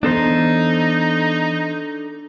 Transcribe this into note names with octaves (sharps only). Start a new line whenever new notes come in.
E3 B3 D4 D#4 A4 C5